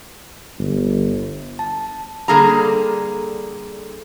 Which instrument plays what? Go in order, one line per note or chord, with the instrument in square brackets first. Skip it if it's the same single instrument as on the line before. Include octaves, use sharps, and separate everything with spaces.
[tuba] G1
[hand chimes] A5
[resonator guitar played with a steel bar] D3 G3 A#3 G#4 A4 A#5